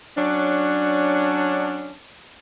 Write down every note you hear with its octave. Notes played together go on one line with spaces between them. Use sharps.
F#3 C#4 D4